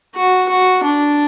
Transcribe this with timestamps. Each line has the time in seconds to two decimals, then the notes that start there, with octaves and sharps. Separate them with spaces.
0.15 F#4
0.49 F#4
0.83 D4